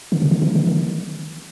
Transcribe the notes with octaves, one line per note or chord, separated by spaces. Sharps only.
D#3
C#3
D#3
E3
D#3
D#3